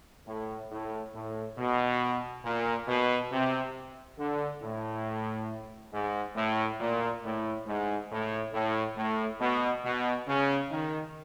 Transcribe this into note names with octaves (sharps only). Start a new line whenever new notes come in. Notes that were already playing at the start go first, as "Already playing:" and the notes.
A2
A2
A2
B2
A#2
B2
C3
D3
A2
G#2
A2
A#2
A2
G#2
A2
A2
A2
B2
B2
C#3
D#3